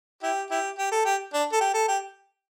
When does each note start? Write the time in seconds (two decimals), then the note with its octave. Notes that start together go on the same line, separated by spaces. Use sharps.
0.23 E4 G4
0.51 E4 G4
0.79 G4
0.92 A4
1.06 G4
1.34 D4
1.52 A4
1.61 G4
1.74 A4
1.88 G4